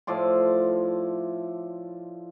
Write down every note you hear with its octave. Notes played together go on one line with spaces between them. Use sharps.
A2 F3 D5 C6